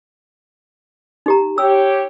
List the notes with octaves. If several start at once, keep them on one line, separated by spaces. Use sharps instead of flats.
D#4 G4 A#5
G4 C#5 E6